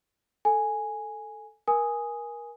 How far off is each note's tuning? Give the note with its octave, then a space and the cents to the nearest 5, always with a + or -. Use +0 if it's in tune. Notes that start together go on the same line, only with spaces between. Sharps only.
A4 +0 G#5 +0
A#4 +25 G#5 +0 D#6 +0